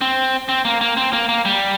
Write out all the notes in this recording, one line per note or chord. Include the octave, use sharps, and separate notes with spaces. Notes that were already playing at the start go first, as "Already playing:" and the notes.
C4
C4
A#3
A#3
C4
A#3
A#3
G3